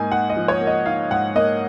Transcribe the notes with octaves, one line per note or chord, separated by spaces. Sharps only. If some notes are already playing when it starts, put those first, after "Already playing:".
Already playing: G#2 A#3 D#4 G#5
D#4 F#5
D#5
F3
C#5
A#3
D#5
D#4 F5
G#2 F#5
A#3 D#5